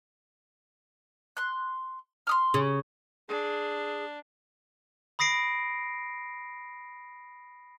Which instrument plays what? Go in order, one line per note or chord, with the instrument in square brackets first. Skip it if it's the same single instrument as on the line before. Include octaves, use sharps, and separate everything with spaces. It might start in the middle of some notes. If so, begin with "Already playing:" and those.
[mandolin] C6 F#6
C6 D#6 F6
[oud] C#3
[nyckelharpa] D4 [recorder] G#4
[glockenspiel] B5 D#6 A#6 C7 D7